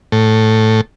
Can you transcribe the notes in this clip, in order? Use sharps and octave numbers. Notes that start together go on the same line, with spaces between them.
A2